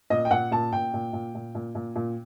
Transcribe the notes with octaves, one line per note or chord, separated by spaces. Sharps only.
A#2 D#5
G5
A#2 F#5
A#2 A5
A#2 G5
A#2
A#2
A#2
A#2
A#2
A#2